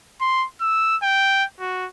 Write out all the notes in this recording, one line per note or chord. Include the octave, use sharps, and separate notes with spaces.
C6
E6
G5
F#4